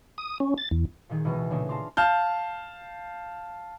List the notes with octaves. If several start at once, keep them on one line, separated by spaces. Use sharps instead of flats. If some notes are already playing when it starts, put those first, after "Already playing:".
D#6
C#4
A6
E2
A#2 D#3 G#4
C#2 B2 E3 G#3 B3 D#5
A#2 C#3 G#3 A3 C#4 D4
F4 A5 A#5 C6 D6
F5 A5 F6 G6